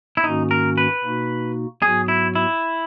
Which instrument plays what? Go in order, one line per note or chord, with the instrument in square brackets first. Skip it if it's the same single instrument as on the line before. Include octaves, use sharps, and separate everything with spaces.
[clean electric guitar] E4
[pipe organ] G#2 D#3 A#3 C#4 F#4 [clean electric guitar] D#4
[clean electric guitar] A#4
B4
[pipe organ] B2 A#3 D#4 F#4
[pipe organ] G#2 F#3 B3 F#4 [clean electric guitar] G#4
[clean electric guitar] E4
E4